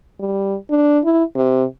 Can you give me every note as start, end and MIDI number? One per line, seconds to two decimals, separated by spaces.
0.20 0.56 55
0.70 0.99 62
1.04 1.23 64
1.35 1.64 48